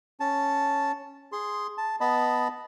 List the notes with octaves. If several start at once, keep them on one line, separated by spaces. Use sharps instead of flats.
C#4 A5
G#4 C6
A5
B3 D#5 A5 B5